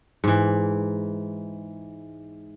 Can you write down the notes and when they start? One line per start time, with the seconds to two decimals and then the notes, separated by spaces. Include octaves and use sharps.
0.24 G#2 E3